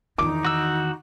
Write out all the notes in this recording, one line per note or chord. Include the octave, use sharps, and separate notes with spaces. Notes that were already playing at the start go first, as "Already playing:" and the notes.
E2 D#3 D#4 D6
F#4 E6